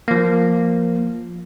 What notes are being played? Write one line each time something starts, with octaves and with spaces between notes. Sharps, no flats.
F3 A#3